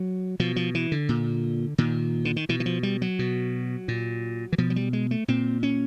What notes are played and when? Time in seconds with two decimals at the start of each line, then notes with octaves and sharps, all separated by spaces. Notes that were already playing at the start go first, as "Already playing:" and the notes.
Already playing: F#3
0.40 B2 F3
0.56 F3
0.75 E3
0.92 D3
1.09 A#2
1.78 A#2 D#3
2.25 D3
2.36 D#3
2.49 B2 E3
2.60 E3
2.66 F3
2.83 G3
3.02 F#3
3.19 B2
3.88 A#2
4.53 E3
4.58 B2 F3
4.70 F#3
4.76 G3
4.93 G#3
5.11 A3
5.28 A#2 C4
5.63 C#4